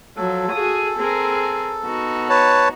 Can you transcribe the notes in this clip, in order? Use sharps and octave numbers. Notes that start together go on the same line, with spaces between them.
F3 F#3 A4
F#4 G#4 D#6
C4 G#4 A#4
B3 D#4 F#4
B4 C#5 A5